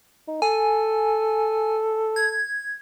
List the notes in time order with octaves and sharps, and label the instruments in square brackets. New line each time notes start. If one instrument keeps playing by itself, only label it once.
[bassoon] D#4
[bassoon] A4 [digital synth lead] G#5
[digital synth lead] G#6